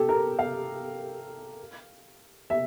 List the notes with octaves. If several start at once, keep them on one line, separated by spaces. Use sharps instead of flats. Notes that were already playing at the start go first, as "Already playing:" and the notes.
Already playing: G4 A4
A#4
F5
E5